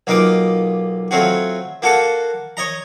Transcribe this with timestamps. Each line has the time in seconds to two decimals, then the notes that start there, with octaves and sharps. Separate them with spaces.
0.07 B1 A#3 D#4 F4 D6
1.11 F#3 A3 C4 F4 F#4
1.82 A#3 F#4 A4 F#5 A5
2.57 C#5 D#5 A#5